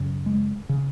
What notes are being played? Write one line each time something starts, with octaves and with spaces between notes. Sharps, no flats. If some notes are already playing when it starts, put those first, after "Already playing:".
Already playing: F#2 C#3
G#3
C#3